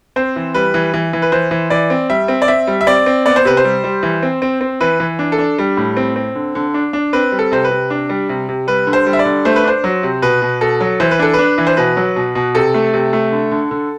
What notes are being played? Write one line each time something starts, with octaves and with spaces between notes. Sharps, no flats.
C4 C5
E3
G3 B4
E3
E3
E3
B4
E3 C5
E3
E3 D5
C4
G3 E5
C4
D5
C4 E5
G3
E5
C4 D5
C4
B3 D5
C5
C3 B4
C5
G3
G3
E3
C4
C4
C4
E3 B4
E3
D4
A4
D4
G3
A2
C4
C4
D3
D3
D4
D4
C4 B4
G3
A4
C3 C5
B4
C3
D4
G3
C3
C3
G3 B4
D3
C5
G3
E5
D5
D3
A3 C5
B4
D4 C5
F#3
C3
B2 B4
B2
B2 A4
F#3
E3 C5
B4
D4 A4
B4
D4
E3
C5
B2 B4
F#3
B2
B2
C3 A4
A3
C3
A3
D3
D3
D3